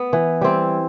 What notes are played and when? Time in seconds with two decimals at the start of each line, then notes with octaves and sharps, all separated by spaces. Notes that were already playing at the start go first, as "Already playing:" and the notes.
Already playing: B3
0.13 E3
0.41 G3 C4 E4